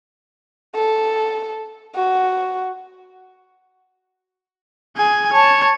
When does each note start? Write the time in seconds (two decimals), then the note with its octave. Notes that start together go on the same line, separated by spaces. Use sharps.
0.75 A4
1.96 F#4
4.97 G#4 G#5
5.33 C#5 A5